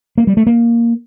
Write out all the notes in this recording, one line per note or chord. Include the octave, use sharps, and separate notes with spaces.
A#3
G3
A3
A#3